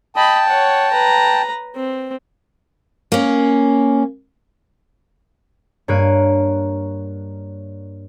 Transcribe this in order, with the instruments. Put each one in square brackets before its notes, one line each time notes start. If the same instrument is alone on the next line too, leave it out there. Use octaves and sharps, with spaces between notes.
[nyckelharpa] D#5 B5 [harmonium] G5 A5
[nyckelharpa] C#5 F#5
B4 A#5
C4
[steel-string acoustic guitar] A#3 C#4
[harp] G2 A#3 C#5 F#6 D7 D#7